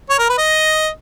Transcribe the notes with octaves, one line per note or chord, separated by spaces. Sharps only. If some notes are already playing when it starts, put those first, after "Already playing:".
C#5
A#4
B4
D#5